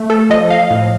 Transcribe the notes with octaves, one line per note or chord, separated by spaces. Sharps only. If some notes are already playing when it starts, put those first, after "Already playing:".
Already playing: A3
A4
F3 D#5
F5
A2